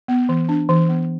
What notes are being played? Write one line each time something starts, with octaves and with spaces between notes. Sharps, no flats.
B3
E3
D4
E3
B3